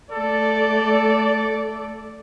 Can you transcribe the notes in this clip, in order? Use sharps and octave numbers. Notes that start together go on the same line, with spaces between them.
A3 A4 D5